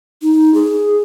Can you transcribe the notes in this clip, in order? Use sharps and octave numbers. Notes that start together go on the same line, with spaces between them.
D#4
G#4